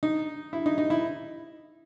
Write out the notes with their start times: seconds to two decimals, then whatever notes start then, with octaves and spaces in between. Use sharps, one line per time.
0.03 D#4
0.53 E4
0.66 D#4
0.78 D#4
0.90 E4